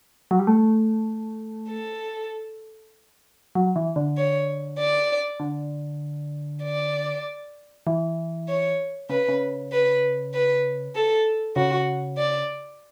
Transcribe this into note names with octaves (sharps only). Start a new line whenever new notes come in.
F#3
G3
A3
A4
F#3
E3
D3
C#5
D5
D3
D5
E3
C#5
C#3 B4
C#3
B4
B4
A4
C#3 F#4
D5